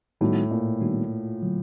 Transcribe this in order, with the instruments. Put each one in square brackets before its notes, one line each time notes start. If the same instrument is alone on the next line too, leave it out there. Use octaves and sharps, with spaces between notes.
[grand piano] A2 [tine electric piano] D#3 G3 B3 D#4 F#4
[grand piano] A#2
[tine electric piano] D#3 G3 B3 D#4 F#4
D3 F#3